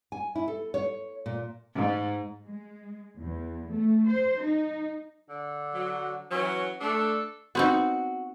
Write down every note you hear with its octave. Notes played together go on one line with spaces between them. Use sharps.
G#5
E4
A4
C#5
A#2
G#2
G#3
E2
A3
C5
D#4
D3
F#3
E3 F#3 C#4
A3 D4 A4
B3 C4 D#4 F#4